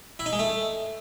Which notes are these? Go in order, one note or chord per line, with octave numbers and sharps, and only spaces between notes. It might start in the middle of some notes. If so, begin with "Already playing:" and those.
E4
D#4
G#3
A3